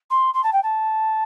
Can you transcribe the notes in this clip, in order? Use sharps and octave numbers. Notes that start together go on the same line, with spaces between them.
C6
C6
A5
G5
A5